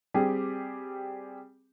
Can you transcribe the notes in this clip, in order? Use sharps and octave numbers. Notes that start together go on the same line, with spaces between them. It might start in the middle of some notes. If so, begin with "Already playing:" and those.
G3 C4 G4 G#4